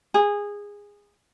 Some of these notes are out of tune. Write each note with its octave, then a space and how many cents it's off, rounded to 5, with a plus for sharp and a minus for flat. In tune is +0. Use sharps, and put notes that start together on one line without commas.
G#4 -20